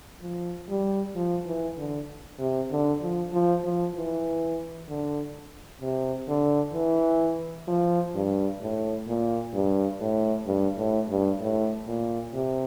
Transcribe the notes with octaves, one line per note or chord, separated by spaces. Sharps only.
F3
G3
F3
E3
D3
C3
D3
F3
F3
F3
E3
D3
C3
D3
E3
F3
G2
A2
A#2
G2
A2
G2
A2
G2
A2
A#2
C3